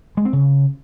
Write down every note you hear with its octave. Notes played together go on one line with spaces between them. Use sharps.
G#3
C4
C#3